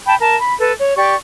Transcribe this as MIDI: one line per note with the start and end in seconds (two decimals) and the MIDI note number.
0.06 0.15 79
0.06 0.15 81
0.06 0.15 83
0.20 0.36 70
0.20 0.36 81
0.40 0.54 83
0.60 0.72 69
0.60 0.72 71
0.79 0.94 73
0.97 1.15 67
0.97 1.15 74
0.97 1.15 85